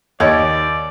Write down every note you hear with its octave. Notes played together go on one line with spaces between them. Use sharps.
D#2 D#4 C#5 D5